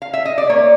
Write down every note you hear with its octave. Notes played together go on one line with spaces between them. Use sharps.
F5
E5
D#5
D5
A#3 C#5